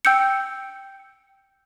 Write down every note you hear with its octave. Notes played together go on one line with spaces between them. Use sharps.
G5 E6 G6 C#7